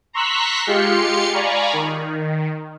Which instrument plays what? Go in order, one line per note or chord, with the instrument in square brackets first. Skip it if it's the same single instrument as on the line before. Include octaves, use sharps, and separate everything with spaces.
[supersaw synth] A#5 C6 C#6 E6 F#6 B6
G#3 F4 G4 F5 C6 C#7
D5 F5 G#5 A#5 B5 C#6
D#3